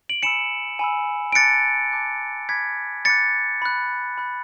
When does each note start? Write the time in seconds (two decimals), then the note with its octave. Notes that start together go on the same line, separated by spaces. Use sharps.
0.09 D7 F#7
0.23 G#5 B5 E6 C#7 E7
0.79 G#5 B5 E6
1.32 D7
1.35 A5 D6 F#6 A6 C#7
1.92 A5 D6 F#6
2.49 B5 D6 F#6 G#6 B6
3.05 B5 D6 F#6 A6 C#7
3.62 B5 F#6
4.18 B5 F#6